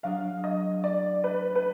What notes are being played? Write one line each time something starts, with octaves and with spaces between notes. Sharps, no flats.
F#3 D4 G#4 F5
D#5
D5
B4
B4